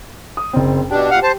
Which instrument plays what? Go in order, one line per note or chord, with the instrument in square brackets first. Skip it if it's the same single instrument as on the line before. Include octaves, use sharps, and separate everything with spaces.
[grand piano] D#6
F#1 C4
[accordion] B2 D4 [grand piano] G4
[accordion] A#2 F5 F#5
C5 A5